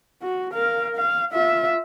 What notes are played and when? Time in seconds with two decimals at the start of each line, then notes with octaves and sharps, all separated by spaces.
0.22 F#4
0.53 A#4 F5
0.96 F5
1.32 F4 E5